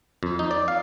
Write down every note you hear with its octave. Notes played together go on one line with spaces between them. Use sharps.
F2
D#4
D5
F5